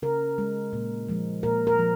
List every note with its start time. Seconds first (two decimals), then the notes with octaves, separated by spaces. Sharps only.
0.02 C#3 A#4
0.38 G#3
0.73 A#2
1.09 F3 G#3
1.43 A#2 A#4
1.67 A#4
1.79 F3